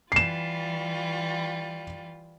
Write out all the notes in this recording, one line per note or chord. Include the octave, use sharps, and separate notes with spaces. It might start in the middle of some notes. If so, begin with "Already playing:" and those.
E3 G3 F4 C7 E7